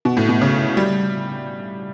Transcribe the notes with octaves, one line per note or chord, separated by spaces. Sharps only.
B2
A2
B2
C#3
G3